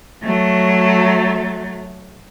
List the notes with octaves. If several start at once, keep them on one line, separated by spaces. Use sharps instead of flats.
F#3 A3